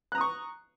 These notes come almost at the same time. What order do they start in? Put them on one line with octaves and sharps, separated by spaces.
F#6 A#5 D#6 C#6